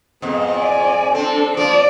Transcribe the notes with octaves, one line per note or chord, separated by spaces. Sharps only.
F2 G#2 B3
D5 G#5
C4 D4 A4
F3 D5